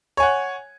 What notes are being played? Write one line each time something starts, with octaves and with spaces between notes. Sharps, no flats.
C#5 F#5 G#5